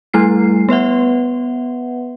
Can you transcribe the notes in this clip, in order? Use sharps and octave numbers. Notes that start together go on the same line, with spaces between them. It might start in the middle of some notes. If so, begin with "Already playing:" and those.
G3 A3 E4 C7
B3 B4 E5 F#5